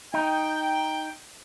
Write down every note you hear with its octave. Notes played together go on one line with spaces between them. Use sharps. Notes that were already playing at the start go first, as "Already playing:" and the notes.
D#4 G5